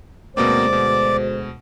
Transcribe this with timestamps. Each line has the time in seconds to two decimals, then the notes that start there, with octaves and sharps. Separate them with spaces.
0.37 D2 B2 G#3 A#3 C4 C5 D5 D6
0.73 B2